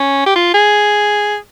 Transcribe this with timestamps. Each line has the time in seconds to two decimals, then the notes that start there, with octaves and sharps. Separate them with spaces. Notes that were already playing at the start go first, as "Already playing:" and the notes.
Already playing: C#4
0.26 G4
0.36 F4
0.54 G#4